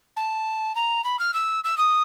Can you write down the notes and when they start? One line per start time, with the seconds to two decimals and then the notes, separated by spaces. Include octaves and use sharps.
0.16 A5
0.75 A#5
1.04 B5
1.19 F6
1.34 E6
1.64 E6
1.78 D#6